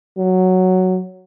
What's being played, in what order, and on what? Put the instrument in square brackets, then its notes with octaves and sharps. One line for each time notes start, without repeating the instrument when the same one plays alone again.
[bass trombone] F#3